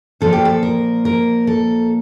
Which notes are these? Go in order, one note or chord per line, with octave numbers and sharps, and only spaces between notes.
A#2 F3 A#3 A4
G4
A4
A#4
A#4
A4